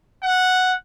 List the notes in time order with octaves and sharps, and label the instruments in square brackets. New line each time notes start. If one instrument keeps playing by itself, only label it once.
[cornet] F#5